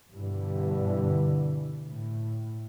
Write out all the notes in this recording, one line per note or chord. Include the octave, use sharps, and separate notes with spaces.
G2 B2 D3 E3
A2